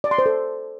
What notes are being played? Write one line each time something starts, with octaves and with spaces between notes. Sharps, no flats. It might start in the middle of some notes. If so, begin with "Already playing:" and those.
D5
C6
C5
A4